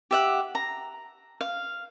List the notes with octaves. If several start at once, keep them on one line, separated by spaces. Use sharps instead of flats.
G4 E5 F#5
A#5
F5